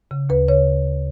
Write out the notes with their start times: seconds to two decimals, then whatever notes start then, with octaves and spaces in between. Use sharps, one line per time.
0.11 C#3
0.29 D2 B4
0.48 C#3 C#5